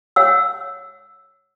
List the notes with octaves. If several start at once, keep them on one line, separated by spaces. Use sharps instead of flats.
C#5 F#5 E6